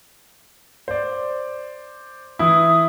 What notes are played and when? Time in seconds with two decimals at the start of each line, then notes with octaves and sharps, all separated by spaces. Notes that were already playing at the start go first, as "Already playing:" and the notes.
0.88 C5 D5
2.39 E3 E4 D#6